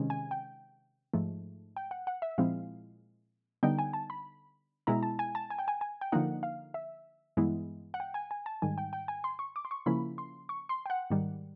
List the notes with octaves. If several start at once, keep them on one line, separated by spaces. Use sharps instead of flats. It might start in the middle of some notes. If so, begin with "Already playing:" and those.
Already playing: C3 D#3 G#3 C#4
G#5
G5
G#2 F3 A3
G5
F#5
F#5
E5
A#2 F3 G#3 C4 E4 F5
D3 G3 B3 D#4 G5
G#5
A5
B5
B2 G#3 B3 E4 A#5
A5
G#5
A5
G#5
G5
G#5
G#5
G5
D3 F3 A#3 D#4 F#5
F5
E5
G2 E3 G#3 B3 E4
F#5
G5
G#5
G#5
A5
G#2 D#3 G3 G#5
G5
G5
G#5
C6
C#6
D6
C6
C#6
C#3 F3 A#3 C#4 E4 B5
C6
C#6
C6
G5
F#5
G#2 D#3 G3